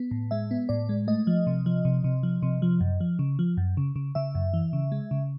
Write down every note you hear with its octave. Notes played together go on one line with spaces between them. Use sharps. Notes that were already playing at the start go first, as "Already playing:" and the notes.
Already playing: B3
A2
G#3 E5
B3
A2 D5
G#3
A3 D#5
F3
C3
F3
C3
C3
F3
C3
F3
F#2
F3
C#3
F3
F#2
C#3
C#3
C#3 E5
F#2
E3
C#3
G#3
C#3